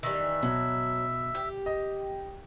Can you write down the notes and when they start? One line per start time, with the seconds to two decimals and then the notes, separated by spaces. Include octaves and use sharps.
0.03 D#3 E3 G3 E5
0.43 B2 F#3
1.35 G4
1.66 D#5